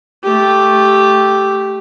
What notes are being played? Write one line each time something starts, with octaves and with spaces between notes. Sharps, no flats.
A3 G4